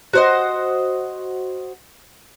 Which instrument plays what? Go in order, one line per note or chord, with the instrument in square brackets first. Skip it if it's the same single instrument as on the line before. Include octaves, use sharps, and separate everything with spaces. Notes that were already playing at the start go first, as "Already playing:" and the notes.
[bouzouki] F#4 C5 D#5